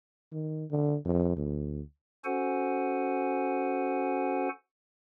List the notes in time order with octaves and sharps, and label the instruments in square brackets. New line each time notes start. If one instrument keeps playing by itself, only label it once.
[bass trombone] D#3
D3
F2
D2
[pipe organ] C#4 F#4 A4 C5 F#5 G#5